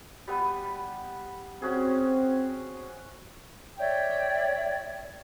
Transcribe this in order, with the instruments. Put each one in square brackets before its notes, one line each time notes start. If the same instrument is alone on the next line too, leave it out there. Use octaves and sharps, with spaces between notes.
[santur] G3 B3
[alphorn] C4 [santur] C#4 F#4 G#4
[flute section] C#5 D5 E5 G5